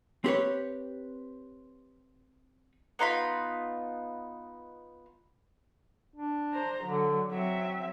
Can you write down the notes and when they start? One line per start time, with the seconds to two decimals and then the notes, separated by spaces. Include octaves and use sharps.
0.24 C4 G4 B4 C#5
2.99 B3 D#4 F4 B5
6.16 D4
6.53 C5 A#5
6.84 D3 F#3
7.31 F#3 C4 E5